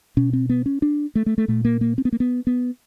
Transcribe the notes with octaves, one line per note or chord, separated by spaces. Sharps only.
B2 C#4
C4
B3
C#4
D4
A3
A3
A3
A#2 A3
A#3
A#3
C4
B3
A#3
B3
B3